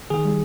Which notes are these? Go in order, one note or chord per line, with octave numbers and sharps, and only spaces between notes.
D#3 G#4
G3